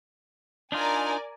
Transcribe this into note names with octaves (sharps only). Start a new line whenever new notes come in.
D4 D#4 F4 A#4 D5 G#5